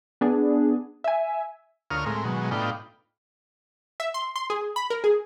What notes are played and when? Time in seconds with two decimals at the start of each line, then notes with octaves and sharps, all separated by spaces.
0.21 B3 D4 G#4
1.04 E5 G#5
1.91 D2 F4 A#4 C#5 D#6 F6
2.06 A2 G#3 C4 A#4
2.25 B2 D#3 F#3 G#3
2.51 A2 B3 D4 D#4 F4 G5
4.00 E5
4.14 C6
4.36 C6
4.50 G#4
4.76 B5
4.90 A#4
5.04 G#4